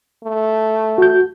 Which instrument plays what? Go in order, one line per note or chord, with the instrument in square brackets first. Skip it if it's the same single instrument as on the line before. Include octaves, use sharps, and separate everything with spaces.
[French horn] A3
[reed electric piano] F#4 G6